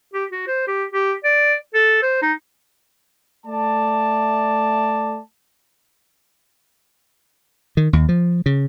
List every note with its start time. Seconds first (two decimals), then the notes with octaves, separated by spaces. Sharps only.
0.13 G4
0.32 F#4
0.47 C5
0.67 G4
0.92 G4
1.24 D5
1.74 A4
2.02 C5
2.22 D#4
3.46 A3 D5 A5
7.77 D#3
7.93 D#2
8.09 F3
8.46 C#3